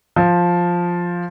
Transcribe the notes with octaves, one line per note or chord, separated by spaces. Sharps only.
F3